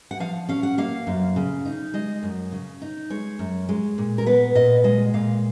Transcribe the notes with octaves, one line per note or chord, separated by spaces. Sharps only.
F#5
F3 F5
C#4 F5
F#5
A#3 F5
F#2
C#3
D#4
G#3 D#5
F#2
C#3
D#4
G#3 C#5
F#2
G#3
A#2
A#4
B3 B4
A#2 D#5
G#3 D#5
A#2 F5